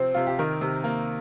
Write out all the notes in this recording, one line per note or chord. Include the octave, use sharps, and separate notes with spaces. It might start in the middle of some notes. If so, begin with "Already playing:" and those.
Already playing: C3 F3 C4 C5
C3 F4
G4
D#3 A#4
C3
A#3